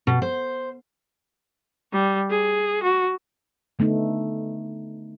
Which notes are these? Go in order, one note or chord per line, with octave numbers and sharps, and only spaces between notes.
B2
C5
G3
G#4
F#4
D3 A3 B3 D#4